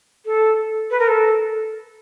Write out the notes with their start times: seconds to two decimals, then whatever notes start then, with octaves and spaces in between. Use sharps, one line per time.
0.25 A4
0.90 B4
0.99 A#4
1.07 A4